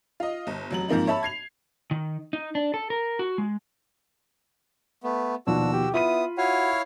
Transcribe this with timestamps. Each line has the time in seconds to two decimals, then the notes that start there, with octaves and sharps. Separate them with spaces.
0.20 F4 D#5
0.47 G1
0.71 F1 F#3 F#7
0.88 G#2 F3 A#3 C4 D#4
1.07 C#5 E5 A5 B5
1.23 G#6 C7 F7
1.91 D#3
2.33 D#4
2.55 D4
2.74 A4
2.90 A#4
3.19 F#4
3.38 G#3
5.03 A3 B3
5.47 D#2 B2 F3 D4 F#4 E6
5.73 G4
5.94 B3 E4 F4 B5 D#6 D#7
6.38 E4 F#4 C#5 F5